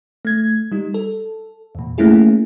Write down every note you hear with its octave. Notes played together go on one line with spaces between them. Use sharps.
A3 G#6
G3 D#4
A4
E2 A#2
A3 A#3 C#4 E4 G#4